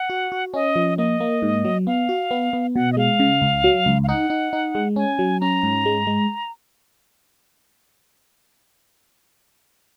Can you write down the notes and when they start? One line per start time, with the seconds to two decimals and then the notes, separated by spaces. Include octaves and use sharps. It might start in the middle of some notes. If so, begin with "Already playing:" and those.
Already playing: F#5
0.10 F#4
0.32 F#4
0.54 C#4 D#5
0.76 F3
0.98 A#3 D#5
1.20 A#3
1.42 G#2
1.65 F#3
1.87 B3 F5
2.09 F#4
2.31 B3
2.53 B3
2.75 B2 F#5
2.92 D#5
2.97 G#3 F5
3.20 C#3
3.42 C#2
3.64 F#3
3.86 C#2
4.04 F5
4.08 D#4 F#5
4.30 D#4
4.53 D#4
4.75 G#3
4.96 C#4 G#5
5.19 F#3
5.41 C#4 A#5
5.63 G#2
5.86 G#3
6.07 G#3